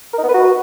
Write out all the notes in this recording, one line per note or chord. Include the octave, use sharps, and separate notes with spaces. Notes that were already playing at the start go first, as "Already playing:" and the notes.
A#4
D#4
B3
B4
F#4